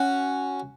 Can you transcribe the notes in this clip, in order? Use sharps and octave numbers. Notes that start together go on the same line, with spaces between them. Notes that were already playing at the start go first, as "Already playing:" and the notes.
Already playing: C#4 F#4